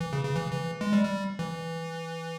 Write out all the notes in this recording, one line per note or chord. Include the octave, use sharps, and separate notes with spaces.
E3
C#3
C#3
E3
E3
G#3
G3
G3
E3